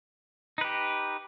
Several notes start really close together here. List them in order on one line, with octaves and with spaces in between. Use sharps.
D#4 B4 G4